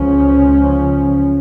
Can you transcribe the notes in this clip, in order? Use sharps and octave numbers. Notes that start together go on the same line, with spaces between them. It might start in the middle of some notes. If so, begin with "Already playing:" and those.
Already playing: C#2 C#3 F3 C#4